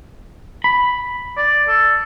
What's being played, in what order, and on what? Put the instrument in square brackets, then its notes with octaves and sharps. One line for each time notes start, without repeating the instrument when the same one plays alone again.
[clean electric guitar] B5
[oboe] D5
A4